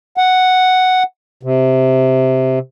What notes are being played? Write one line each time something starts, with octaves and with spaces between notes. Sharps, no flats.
F#5
C3